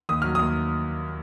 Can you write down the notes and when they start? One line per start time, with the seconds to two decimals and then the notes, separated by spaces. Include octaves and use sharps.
0.09 D#2 D#6
0.22 F#3 F6
0.35 D#2 D#6